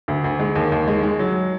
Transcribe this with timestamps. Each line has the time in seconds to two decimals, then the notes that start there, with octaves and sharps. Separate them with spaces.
0.08 D2
0.24 D2
0.40 G#3
0.55 D#2
0.72 D#2
0.88 G#3
1.03 G#3
1.19 F#3